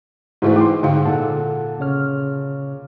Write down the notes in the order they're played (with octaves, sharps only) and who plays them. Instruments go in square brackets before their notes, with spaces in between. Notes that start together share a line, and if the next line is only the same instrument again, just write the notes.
[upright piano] G#2 E3 A3 [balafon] G#3 E4 C5
[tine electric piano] G5 [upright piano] C6 D6
[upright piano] G#2 [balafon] D3 F5 [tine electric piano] G5
[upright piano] A#2 [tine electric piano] A4 F#5 A5
[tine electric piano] C#3 C#5 F6